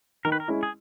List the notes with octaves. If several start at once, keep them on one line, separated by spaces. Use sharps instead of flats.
D#3 A#4
B4
A#4
G#3 C#4 E4
G#4